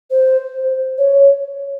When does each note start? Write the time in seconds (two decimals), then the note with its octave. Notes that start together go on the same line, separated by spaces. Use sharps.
0.10 C5
0.98 C#5